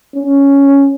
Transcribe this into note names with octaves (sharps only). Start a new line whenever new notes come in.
C#4